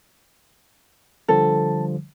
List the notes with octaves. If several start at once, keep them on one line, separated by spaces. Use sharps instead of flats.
D3 F3 G3 A4